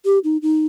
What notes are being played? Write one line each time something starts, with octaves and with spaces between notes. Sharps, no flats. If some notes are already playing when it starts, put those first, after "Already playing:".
G4
D#4
D#4